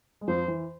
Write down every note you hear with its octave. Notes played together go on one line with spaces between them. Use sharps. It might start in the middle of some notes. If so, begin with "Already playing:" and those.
G#3
F2 F3 C5
E3